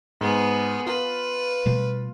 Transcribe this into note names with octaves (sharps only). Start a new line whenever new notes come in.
G#2 B3 G#4
F4 B4
B2 G3 A3